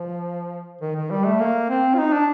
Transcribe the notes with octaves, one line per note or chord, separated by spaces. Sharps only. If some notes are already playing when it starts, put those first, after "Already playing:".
Already playing: F3
D#3
D#3
G3
A3
A#3
C4
F4
D#4
D4